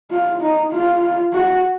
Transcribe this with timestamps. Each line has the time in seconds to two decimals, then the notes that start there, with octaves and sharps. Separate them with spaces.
0.11 F4
0.42 D#4
0.72 F4
1.34 F#4